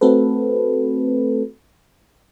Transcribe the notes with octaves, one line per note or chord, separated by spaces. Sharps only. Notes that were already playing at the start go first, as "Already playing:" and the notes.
A3 C4 F#4 A4 B4